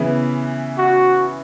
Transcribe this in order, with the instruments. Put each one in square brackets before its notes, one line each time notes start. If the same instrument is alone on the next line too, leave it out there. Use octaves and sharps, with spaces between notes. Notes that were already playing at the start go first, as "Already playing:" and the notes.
Already playing: [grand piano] C#3 E3 B3
[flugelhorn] F#4